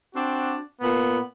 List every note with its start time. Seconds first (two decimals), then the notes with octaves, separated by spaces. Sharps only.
0.14 C4 D4 F#4
0.80 A#2 B3